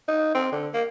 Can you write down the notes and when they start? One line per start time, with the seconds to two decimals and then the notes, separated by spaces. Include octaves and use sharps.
0.08 D#4
0.34 C4
0.52 D3
0.74 A#3